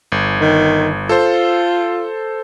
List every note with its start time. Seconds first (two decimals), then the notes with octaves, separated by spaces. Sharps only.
0.12 G1
0.40 D#3
1.09 F4 A4 C5